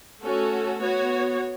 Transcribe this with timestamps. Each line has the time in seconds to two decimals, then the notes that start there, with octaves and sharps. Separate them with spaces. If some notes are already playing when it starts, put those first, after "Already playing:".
0.22 A3 C#4 F#4 A4
0.80 B3 F#4 C#5